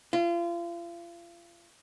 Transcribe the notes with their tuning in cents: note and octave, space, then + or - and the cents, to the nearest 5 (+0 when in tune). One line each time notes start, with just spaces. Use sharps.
F4 -35